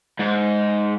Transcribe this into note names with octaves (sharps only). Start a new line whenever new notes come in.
G#2